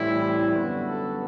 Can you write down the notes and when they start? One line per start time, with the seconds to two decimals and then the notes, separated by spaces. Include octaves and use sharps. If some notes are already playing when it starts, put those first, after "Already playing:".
Already playing: A2 E3 G3 C4 E4
0.53 F#2 D3 G3 B3 F#4
0.87 A4